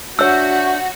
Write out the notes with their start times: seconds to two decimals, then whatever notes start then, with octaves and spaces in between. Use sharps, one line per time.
0.19 D4 F#4 C#5 E5 E6 G6